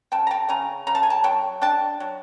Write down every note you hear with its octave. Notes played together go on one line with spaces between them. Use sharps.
C#3 G5 A5
A#5
G5 A5
C#3 G#5 A#5
C#3 A#5
A5
G#5
G5 A5
F#3 G5 A5
D4 G5 A5
F#3